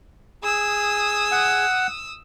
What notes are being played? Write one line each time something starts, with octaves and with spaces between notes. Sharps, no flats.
G#4 D#6 E6
F#5